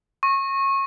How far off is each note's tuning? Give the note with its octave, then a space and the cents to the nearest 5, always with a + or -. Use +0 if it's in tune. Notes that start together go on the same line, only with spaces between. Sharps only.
C#6 -25